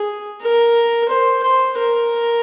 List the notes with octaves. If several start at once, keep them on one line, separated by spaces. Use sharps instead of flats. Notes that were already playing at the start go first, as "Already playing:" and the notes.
Already playing: G#4
A#4
C5
C5
A#4